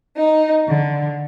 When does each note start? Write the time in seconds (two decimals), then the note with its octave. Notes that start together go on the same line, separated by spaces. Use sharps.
0.16 D#4
0.68 D3